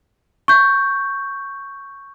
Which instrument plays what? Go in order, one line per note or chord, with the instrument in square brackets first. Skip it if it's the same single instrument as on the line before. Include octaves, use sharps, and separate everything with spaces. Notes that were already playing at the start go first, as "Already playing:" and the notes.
[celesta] C#6 G6